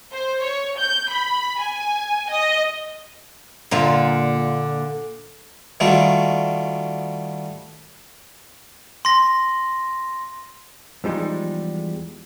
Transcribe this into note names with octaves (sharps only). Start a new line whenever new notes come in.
C5
C#5
G6
B5
G#5
D#5
A#2 D3 F4
D#3 G3 A3 F4 F#4
C6 A#6
E2 F3 G3 G#3 D#4